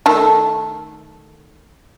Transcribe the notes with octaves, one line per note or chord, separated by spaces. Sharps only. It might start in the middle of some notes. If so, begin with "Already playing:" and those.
D#3 A3 A4